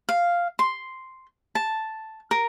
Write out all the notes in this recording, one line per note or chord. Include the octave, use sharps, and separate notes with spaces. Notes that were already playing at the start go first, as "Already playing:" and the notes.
F5
C6
A5
A#4